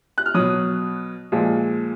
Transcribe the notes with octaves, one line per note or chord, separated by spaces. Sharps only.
F#6
F6
B2 F#3 D#6
A#2 F3 G#3